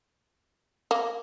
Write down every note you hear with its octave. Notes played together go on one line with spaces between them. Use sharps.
A#3